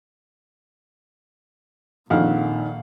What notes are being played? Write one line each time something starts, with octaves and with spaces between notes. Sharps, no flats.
A#1 F2 A#2 D#3 F5 F#5 F6